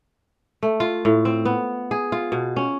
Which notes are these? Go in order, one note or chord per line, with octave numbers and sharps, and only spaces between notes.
A3
F4
A2
C4
B3
G#4
F4
B2
C#4